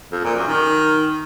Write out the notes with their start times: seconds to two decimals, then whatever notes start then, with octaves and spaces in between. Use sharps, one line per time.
0.12 F2
0.24 A#2
0.36 F#2
0.47 D#3